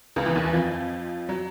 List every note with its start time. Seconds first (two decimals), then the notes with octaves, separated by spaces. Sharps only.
0.16 C#2 C#3
0.26 E2 E3
0.35 D#2 D#3
0.44 E2 E3
0.53 F2 F3
1.29 F#3